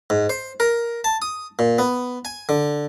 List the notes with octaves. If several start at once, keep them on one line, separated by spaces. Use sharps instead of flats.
G#2
C5
A#4
A5
D#6
A#2
B3
G#5
D3